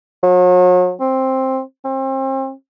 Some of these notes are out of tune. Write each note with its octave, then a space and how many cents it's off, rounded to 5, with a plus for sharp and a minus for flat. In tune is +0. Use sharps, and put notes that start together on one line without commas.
F#3 -40
C4 +10
C4 +35